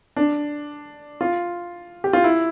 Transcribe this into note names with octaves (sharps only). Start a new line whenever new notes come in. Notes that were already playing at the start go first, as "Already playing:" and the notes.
D4
F4
G4
F4
E4